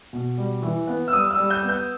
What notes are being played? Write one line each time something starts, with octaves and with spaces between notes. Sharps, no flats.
B2
G3
E3
B3
E6
G3 D#6
E6
G3
G6
B3
G6